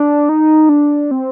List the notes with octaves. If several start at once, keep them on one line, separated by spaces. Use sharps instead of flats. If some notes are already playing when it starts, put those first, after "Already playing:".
Already playing: D4
D#4
D4
C4